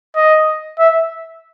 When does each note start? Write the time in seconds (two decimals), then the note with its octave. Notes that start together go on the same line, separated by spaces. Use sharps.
0.16 D#5
0.79 E5